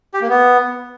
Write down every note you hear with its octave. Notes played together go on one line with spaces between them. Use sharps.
G4
A#3
B3